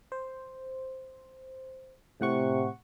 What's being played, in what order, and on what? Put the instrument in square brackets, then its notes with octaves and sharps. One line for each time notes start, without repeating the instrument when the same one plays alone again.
[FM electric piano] C5
[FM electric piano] A2 F#5 C#6 [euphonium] C3